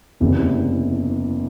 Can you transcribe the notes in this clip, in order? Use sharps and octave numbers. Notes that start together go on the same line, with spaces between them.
F#1 E2 C3